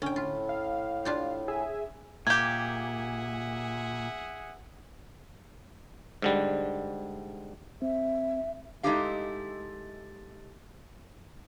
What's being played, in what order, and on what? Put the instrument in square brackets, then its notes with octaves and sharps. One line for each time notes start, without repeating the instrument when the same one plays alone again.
[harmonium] A2 [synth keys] D3 [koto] C#4 G5
[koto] F4
[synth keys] F5
[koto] D4 F4 G4
[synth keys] G#4 E5 G#5
[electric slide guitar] A#2 [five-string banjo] A#3 G4 [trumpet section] G#4 E5 F#5 [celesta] G#6
[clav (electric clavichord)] G#2 D3 G3
[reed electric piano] C4 [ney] E5
[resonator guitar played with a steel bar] G#3 A3 D#4 E4 G4 F5